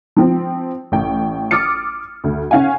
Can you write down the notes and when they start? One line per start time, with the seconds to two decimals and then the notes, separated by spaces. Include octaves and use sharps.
0.16 F3 C4
0.92 A1 G5
1.51 D6 D#6 F6 A6 C#7
2.24 D2
2.51 C#4 F5 F#5 G#5